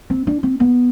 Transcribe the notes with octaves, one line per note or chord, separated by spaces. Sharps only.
C4
D4
C4
B3